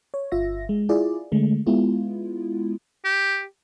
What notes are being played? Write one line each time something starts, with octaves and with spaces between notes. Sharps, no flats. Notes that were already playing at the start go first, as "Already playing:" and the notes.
C#5
G1 F4 E5 A#6
G#3
E4 F4 G#4 D5
D3 G#3 A3
G#3 B3 E4 F4
G4